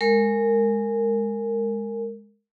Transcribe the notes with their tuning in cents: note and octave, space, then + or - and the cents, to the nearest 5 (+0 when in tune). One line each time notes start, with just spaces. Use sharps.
G#3 +0 A#4 -20